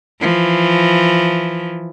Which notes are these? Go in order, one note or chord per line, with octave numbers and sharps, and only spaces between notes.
E3 F3